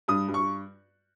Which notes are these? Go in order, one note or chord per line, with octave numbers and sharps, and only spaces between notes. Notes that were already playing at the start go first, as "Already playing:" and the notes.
G2 D#6
G2
C#6